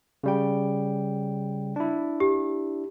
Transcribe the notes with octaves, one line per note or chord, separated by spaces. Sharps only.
C#3 G3 G5
D4 E4
G4